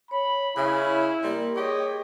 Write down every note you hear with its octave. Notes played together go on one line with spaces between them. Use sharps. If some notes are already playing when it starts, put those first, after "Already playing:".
C#5 B5
C#3 E4
G3 A#3 A#4 C6
G4 G#4 C#5 D#5 C#6